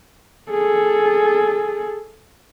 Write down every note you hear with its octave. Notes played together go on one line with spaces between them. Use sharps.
G#4 A4